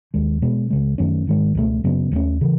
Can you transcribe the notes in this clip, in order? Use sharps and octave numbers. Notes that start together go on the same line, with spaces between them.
D#2 D#3 G#3
B2 G#3 B3
C#2 C#3 G#3
F#2 D#3 A3 C#4
G#2 D#3 G#3
C#2 B2 F#3 A3
F#2 C#3 F#3 B3
D#2 D#3 A3 C#4
C#3 E3